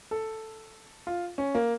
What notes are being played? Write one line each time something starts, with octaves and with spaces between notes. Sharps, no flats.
A4
F4
C#4
A#3